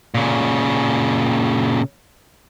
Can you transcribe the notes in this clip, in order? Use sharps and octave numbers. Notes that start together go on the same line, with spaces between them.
A#2 C#3